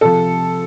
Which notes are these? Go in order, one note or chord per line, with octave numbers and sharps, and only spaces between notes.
C3 F3 A4